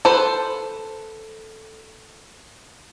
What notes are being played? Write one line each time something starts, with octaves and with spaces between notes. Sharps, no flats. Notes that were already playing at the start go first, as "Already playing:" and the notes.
A4 B4 C5